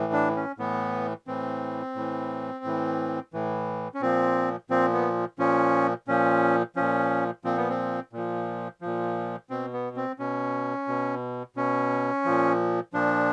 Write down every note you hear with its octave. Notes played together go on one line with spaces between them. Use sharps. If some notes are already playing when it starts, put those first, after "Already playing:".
Already playing: A2 E3
D4
C#4
A2 E3 B3
A2 E3 C4
A2 E3
A2 E3
A2 E3
C#4
A#2 F3 C4
A#2 F3 C4
B3
A#2 F3 C#4
A#2 F3 C#4
A#2 F3 C#4
A#2 F3 C4
B3
C4
A#2 F3
A#2 F3
B2 C4
B3
C4
B2 C#4
B2
B2 C#4
A#2 F3
A#2 F3 D4